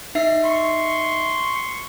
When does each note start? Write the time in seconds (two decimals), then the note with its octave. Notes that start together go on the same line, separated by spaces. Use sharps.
0.15 D#4 E5 C7
0.45 C6 C#6